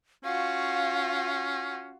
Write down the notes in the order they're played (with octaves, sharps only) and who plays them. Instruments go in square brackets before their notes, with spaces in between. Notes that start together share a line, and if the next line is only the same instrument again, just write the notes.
[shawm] C#4 [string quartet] F4 F#4 [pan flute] F5